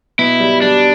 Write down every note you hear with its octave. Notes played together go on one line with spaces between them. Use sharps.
B2 E4
G3
G3 D4